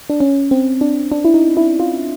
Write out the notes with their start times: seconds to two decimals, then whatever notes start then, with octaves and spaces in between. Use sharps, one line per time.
0.10 D4
0.20 C#4
0.51 C4
0.81 D4
1.12 D4
1.25 E4
1.34 D#4
1.57 E4
1.80 F4